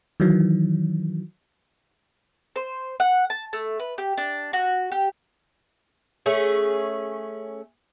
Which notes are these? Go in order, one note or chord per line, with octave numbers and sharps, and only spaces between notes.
D#3 E3 F#3
C5
F#5
A5
A3
B4
G4
D4
F#4
G4
A3 C#4 G#4